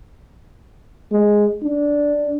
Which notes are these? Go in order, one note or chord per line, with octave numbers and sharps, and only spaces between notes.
G#3
D4